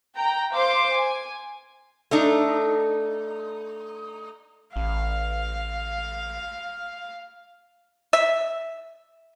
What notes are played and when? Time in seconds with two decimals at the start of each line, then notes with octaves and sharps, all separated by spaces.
0.16 G5 A#5
0.53 C5 F5 C6 D6
0.94 G#5
2.11 A3 D4 D#4
4.76 A1 F5
8.13 E5